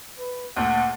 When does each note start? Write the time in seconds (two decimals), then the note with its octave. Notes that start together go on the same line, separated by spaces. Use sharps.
0.19 B4
0.57 D2 A#2 F#5